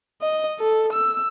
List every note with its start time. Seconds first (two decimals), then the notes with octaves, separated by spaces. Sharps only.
0.22 D#5
0.59 A4
0.93 E6